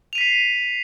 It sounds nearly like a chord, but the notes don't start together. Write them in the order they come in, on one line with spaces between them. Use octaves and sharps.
F7 D#7 B6 C7